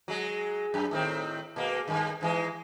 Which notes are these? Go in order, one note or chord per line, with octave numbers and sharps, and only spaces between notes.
F#3 G#3
F#2
A2 D#3 C4
B2 G#3 A#3
G2 D#3
G#2 E3 G#3